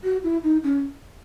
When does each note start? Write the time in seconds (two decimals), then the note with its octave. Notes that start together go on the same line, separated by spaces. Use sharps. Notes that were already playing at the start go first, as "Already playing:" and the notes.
0.04 F#4
0.24 E4
0.44 D#4
0.63 C#4